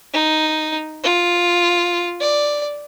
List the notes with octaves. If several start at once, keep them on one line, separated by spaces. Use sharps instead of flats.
D#4
F4
D5